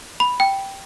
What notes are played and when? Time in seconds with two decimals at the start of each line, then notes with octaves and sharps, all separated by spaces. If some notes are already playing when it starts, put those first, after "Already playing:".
0.20 B5
0.40 G5